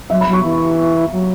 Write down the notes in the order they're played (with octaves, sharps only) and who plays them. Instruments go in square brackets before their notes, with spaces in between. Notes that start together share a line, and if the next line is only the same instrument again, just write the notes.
[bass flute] F#3 [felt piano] E5
[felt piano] B5
[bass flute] F#3
[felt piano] C#6
[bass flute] E3
F#3